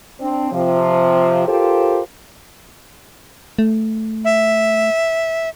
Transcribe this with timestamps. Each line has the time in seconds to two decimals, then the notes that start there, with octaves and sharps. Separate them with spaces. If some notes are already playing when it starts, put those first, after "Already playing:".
0.21 C4 D4
0.52 C3 F3
1.48 F4 G4 A4 A#4 C5
3.59 A3
4.25 E5